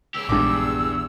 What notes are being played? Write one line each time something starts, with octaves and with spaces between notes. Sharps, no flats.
C#2 G4 E6
A#1 E2 G2 G#3 D6